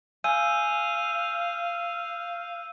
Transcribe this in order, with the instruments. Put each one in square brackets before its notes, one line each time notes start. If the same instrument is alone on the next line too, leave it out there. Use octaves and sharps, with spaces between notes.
[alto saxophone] F5 [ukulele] G#5 [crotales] E6 G6 D#7